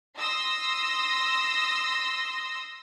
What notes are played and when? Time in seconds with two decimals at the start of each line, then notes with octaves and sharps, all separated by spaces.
0.19 C6 D#6 E6 A#6